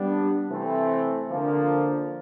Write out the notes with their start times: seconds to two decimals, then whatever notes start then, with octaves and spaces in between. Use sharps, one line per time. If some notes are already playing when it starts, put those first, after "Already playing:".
Already playing: G3 B3 D4
0.48 C3 E3 A3 C4
1.29 D3 F3 A#3